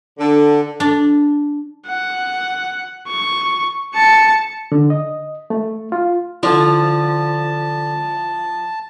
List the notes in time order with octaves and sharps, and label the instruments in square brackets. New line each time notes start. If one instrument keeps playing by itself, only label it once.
[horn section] D3
[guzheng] D4
[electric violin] F#5
C#6
A5 C#7
[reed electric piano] D3
D#5
A3
F4
[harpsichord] D3 D4 [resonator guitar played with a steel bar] F3 [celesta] E4 [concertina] A5